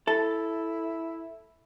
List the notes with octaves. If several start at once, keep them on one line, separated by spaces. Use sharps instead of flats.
E4 A4